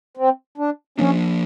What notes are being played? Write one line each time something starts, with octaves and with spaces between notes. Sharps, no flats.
C4
D4
F3 A#3 C#4 D4